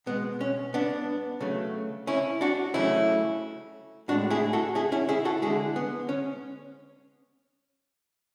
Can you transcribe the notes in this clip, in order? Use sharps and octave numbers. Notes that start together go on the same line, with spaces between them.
B2 G#3 B3
C#4
B3 D4
C#3 F#3 A3
C#4 E4
D4 F#4
C#3 F#3 A3 C#4 E4
A2 G#3 D4 F#4
E4 G#4
F#4 A4
E4 G#4
C#4 E4
E4 G#4
F#4 A4
D3 G#3 E4 G#4
B3
C#4